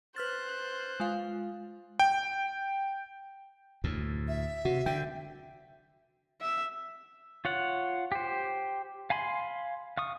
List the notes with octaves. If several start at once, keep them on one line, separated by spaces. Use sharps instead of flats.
B4 C5 F6 F#6 A6
G#3 F4 F5
G5
D2 A2
E5
C3 F#4
D3 G5
E5
F4 C#5 F#5
G4 C5
F5 G#5 B5 C6
F5 C#6 D#6